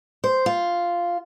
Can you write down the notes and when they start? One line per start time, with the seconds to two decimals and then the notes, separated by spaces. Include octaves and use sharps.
0.24 C5
0.46 F4